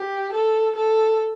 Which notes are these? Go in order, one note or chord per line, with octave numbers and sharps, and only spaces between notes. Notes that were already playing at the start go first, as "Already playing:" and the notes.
Already playing: G4
A4
A4